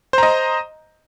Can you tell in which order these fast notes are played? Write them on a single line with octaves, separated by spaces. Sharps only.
C5 A#5 D#5